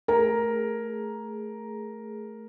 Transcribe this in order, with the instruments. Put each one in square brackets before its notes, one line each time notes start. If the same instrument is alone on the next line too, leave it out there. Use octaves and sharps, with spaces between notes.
[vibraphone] A3 G#4 [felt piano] A#4 A#5